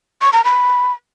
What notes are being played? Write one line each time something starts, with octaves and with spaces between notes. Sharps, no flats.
C#6
A#5
B5